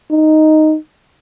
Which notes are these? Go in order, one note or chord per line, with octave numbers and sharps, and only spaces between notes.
D#4